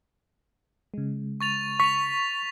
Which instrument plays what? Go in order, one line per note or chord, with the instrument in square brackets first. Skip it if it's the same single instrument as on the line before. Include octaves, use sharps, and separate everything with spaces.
[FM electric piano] C#3 G#3
[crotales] C#6 A6 F7
[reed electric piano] C#6 [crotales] B6 F7